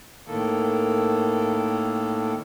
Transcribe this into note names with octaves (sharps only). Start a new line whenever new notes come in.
A2 D#3 A#3 A4